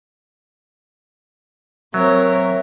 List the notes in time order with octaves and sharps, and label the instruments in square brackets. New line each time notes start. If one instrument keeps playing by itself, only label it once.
[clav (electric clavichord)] F#3 [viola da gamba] C4 A#4 C#5 [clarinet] E5